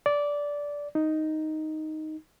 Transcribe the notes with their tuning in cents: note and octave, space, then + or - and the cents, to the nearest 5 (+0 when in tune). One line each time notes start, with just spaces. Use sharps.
D5 -15
D#4 +0